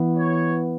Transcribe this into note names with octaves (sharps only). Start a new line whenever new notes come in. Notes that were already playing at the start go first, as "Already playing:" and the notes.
Already playing: E3 B3
C#5